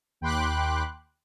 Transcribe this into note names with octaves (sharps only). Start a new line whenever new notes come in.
D#2 G5 B5 C6 D6 F#6